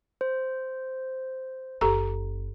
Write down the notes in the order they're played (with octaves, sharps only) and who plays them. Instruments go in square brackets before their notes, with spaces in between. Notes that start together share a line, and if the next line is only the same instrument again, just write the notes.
[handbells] C5
[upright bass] F#1 [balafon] G4 A4 A#5